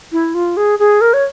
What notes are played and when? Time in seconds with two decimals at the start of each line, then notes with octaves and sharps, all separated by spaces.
0.12 E4
0.34 F4
0.57 G#4
0.79 G#4
1.01 A#4
1.14 C#5